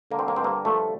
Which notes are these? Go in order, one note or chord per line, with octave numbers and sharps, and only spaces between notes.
D3 A#3
C4
A#3
G2 C4
A#3
F3 A3